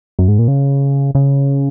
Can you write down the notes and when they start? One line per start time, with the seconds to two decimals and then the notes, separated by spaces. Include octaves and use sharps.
0.19 F#2
0.28 G#2
0.39 A#2
0.48 C#3
1.15 C#3